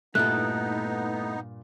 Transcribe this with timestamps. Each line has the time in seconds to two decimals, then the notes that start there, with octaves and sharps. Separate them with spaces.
0.15 G2 A#2 A3 B3 D#4 E4 A4 F#6